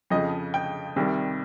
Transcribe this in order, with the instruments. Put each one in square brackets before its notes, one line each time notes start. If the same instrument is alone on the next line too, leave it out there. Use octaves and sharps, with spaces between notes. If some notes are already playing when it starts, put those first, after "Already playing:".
[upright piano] F2 C#3 F3 D#5
G5
C2 C3 D#3 G3